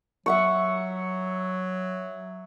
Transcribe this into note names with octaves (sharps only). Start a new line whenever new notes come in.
F#3 E5 F#5 C#6